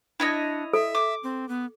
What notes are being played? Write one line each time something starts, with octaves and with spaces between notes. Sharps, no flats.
D4 E4 C#5 D#5
A4 E5
D6
C4
B3